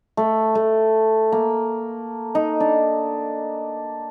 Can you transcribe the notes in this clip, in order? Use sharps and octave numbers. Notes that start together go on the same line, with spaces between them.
A3
A3
A#3
D#4
D4